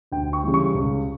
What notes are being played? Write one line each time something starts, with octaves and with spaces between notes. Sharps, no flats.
D2 G5
C#6
C#3 E3 G3
C#6
C#2